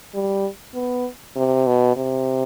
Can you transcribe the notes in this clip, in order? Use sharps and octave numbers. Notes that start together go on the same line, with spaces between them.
G3
B3
C3
B2
C3